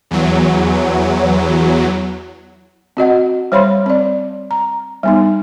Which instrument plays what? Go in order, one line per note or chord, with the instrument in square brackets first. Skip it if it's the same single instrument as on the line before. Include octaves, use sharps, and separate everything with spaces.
[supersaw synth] E2 F#3
[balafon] C4 F#4 D#5 F#5
G3 C5 C#5 F5 B5 C6
C4 D5
A#5
G3 B3 D#4